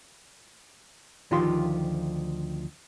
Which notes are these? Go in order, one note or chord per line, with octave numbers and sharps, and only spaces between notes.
D2 D#3 F3 F4 G4 C6